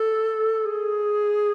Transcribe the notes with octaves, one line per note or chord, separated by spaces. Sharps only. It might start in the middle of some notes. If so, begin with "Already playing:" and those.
Already playing: A4
G#4